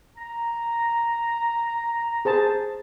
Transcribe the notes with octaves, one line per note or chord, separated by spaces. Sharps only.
A#5
G#4 C5 A5